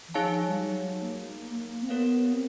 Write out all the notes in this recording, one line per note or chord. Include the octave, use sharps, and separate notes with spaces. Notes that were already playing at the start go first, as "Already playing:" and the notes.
E3
F3 D#4 G#4 C#5 F5 A5
G3
F#3
A#3
C4
B3 G4 A#4 C#5 F5
C4